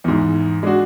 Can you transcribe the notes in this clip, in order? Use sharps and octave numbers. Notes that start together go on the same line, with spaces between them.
E2 G#2
G#3 D4 F#4